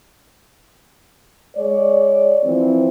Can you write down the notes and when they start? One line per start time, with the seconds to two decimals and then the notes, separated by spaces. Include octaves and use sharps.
1.56 G#3 C#5 D5
2.44 E3 F3 C4